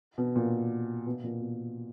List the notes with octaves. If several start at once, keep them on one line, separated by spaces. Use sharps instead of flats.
B2
A#2
B2
A#2
B2